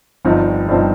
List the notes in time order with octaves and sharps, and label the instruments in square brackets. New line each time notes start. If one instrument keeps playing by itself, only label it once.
[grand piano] G1 G2 F3 C4 D#4
G1 G2 F3 C4 D#4